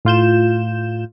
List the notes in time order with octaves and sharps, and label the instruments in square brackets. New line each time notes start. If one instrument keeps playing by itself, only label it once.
[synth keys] A2 F4 G6 E7